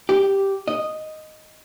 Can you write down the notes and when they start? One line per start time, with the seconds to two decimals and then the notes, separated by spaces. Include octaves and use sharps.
0.09 G4
0.68 D#5